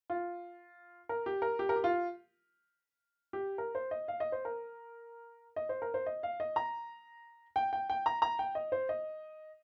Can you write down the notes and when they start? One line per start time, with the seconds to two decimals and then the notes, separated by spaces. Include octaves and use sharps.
0.10 F4
1.09 A#4
1.26 G4
1.42 A#4
1.59 G4
1.69 A#4
1.76 G4
1.84 F4
3.33 G4
3.58 A#4
3.75 C5
3.91 D#5
4.08 F5
4.20 D#5
4.32 C5
4.45 A#4
5.56 D#5
5.69 C5
5.82 A#4
5.94 C5
6.06 D#5
6.23 F5
6.40 D#5
6.56 A#5
7.56 G5
7.73 G5
7.90 G5
8.06 A#5
8.22 A#5
8.39 G5
8.55 D#5
8.72 C5
8.89 D#5